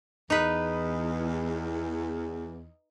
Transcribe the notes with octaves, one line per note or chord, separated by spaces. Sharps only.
E2 D#4 B4